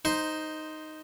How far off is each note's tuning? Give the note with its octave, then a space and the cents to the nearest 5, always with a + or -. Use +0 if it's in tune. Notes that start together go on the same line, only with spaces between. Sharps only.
D#4 +0 C5 +0